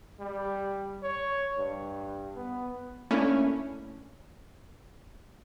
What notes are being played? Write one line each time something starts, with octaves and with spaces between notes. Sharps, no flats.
G3
C#5
G2
B3
A3 A#3 C#4 D4 E4